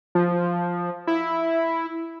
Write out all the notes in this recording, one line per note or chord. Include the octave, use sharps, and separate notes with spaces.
F3
E4